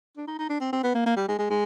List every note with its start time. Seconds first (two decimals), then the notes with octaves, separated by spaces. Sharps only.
0.17 D4
0.27 D#4
0.39 D#4
0.49 D4
0.60 C4
0.73 C4
0.83 B3
0.95 A#3
1.06 A#3
1.16 G3
1.28 G#3
1.39 G#3
1.50 G#3